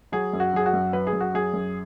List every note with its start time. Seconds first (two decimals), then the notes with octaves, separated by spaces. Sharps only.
0.12 F#3 G#4
0.33 F#2
0.40 F#4
0.53 F#3 G#4
0.66 F#4
0.73 F#2
0.93 F#3 B4
1.07 G#4
1.13 F#2
1.20 F#4
1.34 F#3 G#4
1.53 F#2